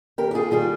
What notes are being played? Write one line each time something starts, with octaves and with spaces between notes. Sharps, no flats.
D#2 G4 A#4
G4
F4 G#4
D#3 G3 F4 G#4